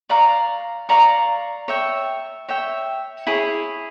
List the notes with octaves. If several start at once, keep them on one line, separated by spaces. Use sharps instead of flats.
D5 F5 A#5 C#6
D5 F5 A#5 C#6
C#5 E5 G5
C#5 E5 G5
E4 G#4 C#5